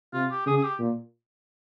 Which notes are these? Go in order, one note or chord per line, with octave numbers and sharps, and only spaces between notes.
C3 F4
G4
C#3 G#4
G#4
G4
A#2